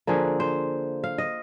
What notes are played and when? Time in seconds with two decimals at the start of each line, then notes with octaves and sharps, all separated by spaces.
0.07 D3 F3 A#3 G#4
0.40 C5
1.04 F5
1.18 D#5